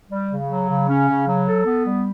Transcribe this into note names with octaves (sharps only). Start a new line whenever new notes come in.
G3
C#3
F#3
C#3
C#4
C#3
F#3
A4
B3
G3